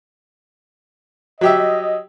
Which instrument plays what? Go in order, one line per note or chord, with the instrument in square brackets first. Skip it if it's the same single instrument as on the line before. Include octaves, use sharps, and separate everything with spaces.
[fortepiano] F#3 G4 E5 [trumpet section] D#5